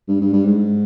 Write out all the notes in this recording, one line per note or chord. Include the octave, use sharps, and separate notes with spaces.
G2
G2
G2
G#2